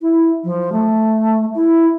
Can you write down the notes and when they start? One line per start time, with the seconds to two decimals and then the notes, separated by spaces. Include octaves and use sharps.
0.01 E4
0.44 F3
0.72 A3
1.55 E4